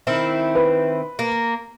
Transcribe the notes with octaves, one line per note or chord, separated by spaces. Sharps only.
D#3 C4 E4
B4
A#3